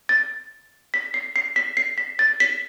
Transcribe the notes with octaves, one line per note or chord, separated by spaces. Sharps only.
A6
B6
C7
C7
B6
C7
B6
A6
B6